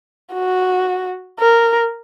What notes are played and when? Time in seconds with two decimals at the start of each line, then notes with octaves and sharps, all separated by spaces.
0.33 F#4
1.39 A#4